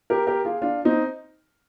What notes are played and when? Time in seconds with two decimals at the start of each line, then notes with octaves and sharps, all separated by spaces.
0.10 G4 A#4
0.27 G4 A#4
0.45 F4 G#4
0.62 D4 F4
0.85 C4 D#4